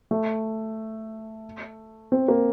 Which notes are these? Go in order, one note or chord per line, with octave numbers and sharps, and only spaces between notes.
A3
C4
A#3